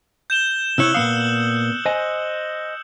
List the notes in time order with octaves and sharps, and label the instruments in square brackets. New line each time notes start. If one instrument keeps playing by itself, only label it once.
[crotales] G6 E7 G7
[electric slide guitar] C3 E4 C#5 [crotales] E6 F#6 F#7
[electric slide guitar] A#2 B3 F5 [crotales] D#6 E6 C#7
[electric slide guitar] C5 D#5 G#5